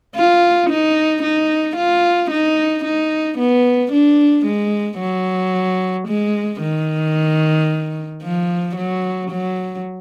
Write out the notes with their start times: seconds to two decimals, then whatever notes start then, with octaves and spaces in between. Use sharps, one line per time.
0.16 F4
0.70 D#4
1.23 D#4
1.77 F4
2.31 D#4
2.85 D#4
3.39 B3
3.92 D4
4.46 G#3
5.00 F#3
6.08 G#3
6.61 D#3
8.23 F3
8.76 F#3
9.30 F#3